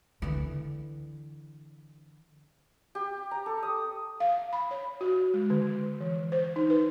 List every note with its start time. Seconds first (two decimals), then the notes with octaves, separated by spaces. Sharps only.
0.22 D3 E3
2.95 G4
3.31 A#5
3.46 A4
3.63 D#6
4.20 F5
4.53 B5
4.71 C#5
5.01 F#4
5.34 G#3
5.50 D3
6.01 E3
6.32 C5
6.56 D#4
6.70 B4